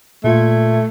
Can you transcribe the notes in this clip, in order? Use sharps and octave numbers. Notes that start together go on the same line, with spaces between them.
A#2 A3 F4 G#6